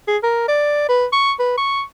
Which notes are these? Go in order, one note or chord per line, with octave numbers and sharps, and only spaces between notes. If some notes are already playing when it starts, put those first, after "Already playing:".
G#4
A#4
D5
B4
C#6
B4
C#6